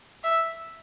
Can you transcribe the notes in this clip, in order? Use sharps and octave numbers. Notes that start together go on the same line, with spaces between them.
E5